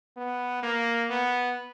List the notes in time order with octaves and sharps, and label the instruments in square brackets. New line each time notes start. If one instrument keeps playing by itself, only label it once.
[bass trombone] B3
A#3
B3